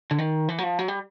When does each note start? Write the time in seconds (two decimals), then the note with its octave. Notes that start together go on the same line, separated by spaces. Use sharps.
0.11 D3
0.18 D#3
0.48 E3
0.58 F#3
0.63 F3
0.79 F#3
0.88 G3